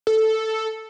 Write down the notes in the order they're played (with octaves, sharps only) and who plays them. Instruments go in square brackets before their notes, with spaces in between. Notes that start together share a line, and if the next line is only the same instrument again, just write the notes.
[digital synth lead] A4